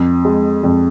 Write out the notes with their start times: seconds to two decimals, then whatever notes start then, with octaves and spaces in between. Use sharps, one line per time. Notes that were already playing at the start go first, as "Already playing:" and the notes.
Already playing: F2
0.25 G#3
0.64 F2